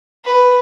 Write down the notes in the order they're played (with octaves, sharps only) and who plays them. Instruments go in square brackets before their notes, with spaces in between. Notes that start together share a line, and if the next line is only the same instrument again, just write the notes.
[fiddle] B4